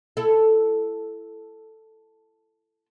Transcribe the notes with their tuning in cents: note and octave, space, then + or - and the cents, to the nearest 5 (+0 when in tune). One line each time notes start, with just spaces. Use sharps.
E4 +25 A4 +0